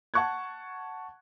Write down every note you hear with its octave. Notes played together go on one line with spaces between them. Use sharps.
F#5 A5 C#6 F#6 G#6